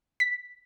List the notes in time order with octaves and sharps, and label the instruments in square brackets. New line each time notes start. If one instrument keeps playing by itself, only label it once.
[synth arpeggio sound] B6